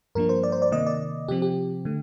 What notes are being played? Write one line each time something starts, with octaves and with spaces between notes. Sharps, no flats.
G2 F3 A#3 D4 A#4
C5
D5
C5
D5
C3 D#3 A#3 D#5
D5
C3 F3 C4 G4
G4
D3 A3